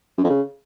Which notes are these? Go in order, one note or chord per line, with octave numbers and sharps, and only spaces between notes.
F#2
F2
C#3